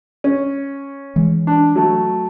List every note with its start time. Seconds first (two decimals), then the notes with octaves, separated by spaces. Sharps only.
0.24 C#4
1.16 E3 G#3
1.47 D4
1.76 F#3 A3